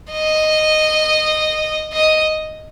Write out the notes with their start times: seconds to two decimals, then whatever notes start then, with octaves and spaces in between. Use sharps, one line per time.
0.11 D#5
1.93 D#5